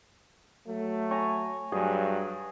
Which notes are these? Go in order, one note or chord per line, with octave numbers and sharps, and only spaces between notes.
F#3 A3
C#5 G#5 A#5
G2 F#3 G#4